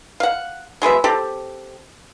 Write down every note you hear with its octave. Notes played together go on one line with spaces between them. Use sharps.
F5 F#5
F#3 G#3 B3 E5
C4 G4 A4